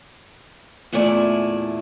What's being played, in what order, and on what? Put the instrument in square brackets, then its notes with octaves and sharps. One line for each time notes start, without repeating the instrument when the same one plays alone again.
[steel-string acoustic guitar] E2 A#2 A3 E4 D5 G#5